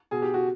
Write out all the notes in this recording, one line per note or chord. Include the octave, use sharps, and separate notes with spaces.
B2 G#4
G4
F#4